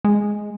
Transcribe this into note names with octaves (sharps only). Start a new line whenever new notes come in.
G#3